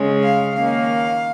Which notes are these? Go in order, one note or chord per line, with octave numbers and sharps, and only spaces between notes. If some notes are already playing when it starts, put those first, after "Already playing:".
Already playing: C#3 G#3 C#4
F5
D#3 A#3 C#4 F5